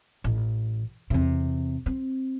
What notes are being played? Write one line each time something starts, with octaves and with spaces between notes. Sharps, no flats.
A1
E2 C3
C4